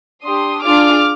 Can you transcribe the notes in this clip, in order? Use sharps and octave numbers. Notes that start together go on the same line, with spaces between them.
D4 G4 C6 D#6
D4 F4 G#4 D6 F6